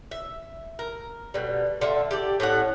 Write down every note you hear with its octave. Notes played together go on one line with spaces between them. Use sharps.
E5
A#4
B2 D3 G3
D3 F4 E5
G4 A4 D5
A2 C#4 A4 F#5